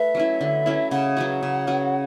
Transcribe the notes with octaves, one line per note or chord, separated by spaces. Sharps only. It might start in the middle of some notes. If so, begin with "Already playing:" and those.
Already playing: A3 B4 E5
F#3 C#4 E4
D3
F#3 C#4 E4
C#3 F#5
F#3 C#4 F#4
C#3
F#3 C#4 F#4